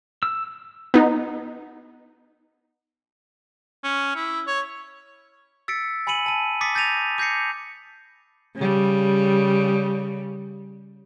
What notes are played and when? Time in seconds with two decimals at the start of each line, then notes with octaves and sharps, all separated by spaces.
0.23 E6
0.94 B3 D#4
3.84 C#4
4.15 E4
4.47 C#5
5.68 E6 A6 B6 C#7 D7
6.07 G#5 B5 E6 C#7 D#7 F#7
6.26 A5 D#7
6.61 D6 D#6 A6 B6 C#7
6.75 G6 A6 A#6 D#7 F7
7.18 D6 G6 A#6 C7 C#7
8.56 C#3 G3